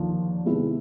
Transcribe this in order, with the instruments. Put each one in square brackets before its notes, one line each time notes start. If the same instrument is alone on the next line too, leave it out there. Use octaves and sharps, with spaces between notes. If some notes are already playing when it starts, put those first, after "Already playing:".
Already playing: [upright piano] D#2 D3 F3 A#3
C3 D#3 G#3 B3 E4